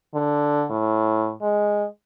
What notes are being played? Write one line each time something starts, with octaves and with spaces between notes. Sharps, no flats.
D3
A2
G#3